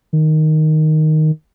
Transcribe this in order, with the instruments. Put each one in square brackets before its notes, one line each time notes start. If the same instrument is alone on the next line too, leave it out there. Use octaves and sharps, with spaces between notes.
[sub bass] D#3